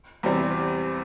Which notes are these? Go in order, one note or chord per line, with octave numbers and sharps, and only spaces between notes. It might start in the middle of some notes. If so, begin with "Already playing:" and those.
E2 C3 G3 C4